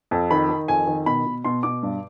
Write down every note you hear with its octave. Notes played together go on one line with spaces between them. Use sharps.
F2
D#3 B5
D#3
F2 G#5
D#3
B2 B5
B2
B2 C6
B2 D6
G2